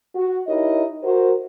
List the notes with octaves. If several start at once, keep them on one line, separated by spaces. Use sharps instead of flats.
F#4
D#4 E4 G4 A#4 C#5 D#5
F#4 A#4 C5